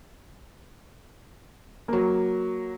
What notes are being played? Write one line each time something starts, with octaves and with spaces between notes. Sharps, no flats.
F#3 A#3